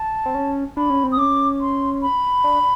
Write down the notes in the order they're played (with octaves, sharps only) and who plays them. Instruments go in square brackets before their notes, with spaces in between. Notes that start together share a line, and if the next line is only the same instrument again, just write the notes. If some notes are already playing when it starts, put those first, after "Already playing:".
Already playing: [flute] A5
[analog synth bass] C4
C#4
[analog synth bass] D4 [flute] B5
[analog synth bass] C#4
C4
[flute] D#6
[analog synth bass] C#4 [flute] D6
[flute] C6
B5
[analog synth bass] D4